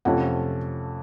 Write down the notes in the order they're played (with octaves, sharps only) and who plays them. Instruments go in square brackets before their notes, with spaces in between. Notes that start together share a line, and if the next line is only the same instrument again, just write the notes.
[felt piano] F2 C3 F3 A3 C#4 F#5